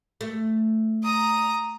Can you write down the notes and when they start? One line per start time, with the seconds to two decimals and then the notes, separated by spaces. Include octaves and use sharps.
0.21 A3
1.03 A#5 D#6